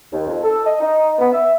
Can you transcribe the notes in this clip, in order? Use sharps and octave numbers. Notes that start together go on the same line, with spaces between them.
D#2
F2
A4
D#5
D#4
B3
E5